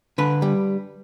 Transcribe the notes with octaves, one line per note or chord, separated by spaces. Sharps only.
D3 B4
G3